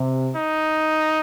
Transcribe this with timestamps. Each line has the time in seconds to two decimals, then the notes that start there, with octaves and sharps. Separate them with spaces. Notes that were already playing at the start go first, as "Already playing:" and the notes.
Already playing: C3
0.36 D#4